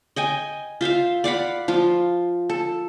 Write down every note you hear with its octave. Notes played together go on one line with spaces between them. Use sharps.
D#5 G5 G#5
F4 C5 E5 F5
D5 F5 F#5 B5
F3 F4
A4